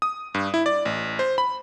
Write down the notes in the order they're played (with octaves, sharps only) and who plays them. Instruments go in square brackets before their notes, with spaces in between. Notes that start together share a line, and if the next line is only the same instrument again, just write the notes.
[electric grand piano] D#6
G2
E4
D5
A1
C5
B5